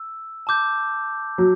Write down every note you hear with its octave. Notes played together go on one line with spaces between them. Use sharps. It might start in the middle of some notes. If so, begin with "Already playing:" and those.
Already playing: E6
A5 D6 G6
F#3